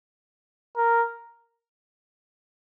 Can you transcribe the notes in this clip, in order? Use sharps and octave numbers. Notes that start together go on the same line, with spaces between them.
A#4